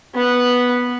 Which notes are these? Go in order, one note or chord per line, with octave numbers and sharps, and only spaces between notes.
B3 F#5